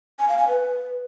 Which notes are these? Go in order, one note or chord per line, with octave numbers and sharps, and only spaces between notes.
G#5
F5
G#5
B4